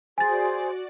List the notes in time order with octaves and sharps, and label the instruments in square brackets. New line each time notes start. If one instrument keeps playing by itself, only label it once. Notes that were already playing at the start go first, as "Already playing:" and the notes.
[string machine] F#4 D5 [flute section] G#4 C5 [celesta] G#5 A6